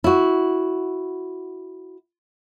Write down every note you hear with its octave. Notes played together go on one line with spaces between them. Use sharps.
E4 F#4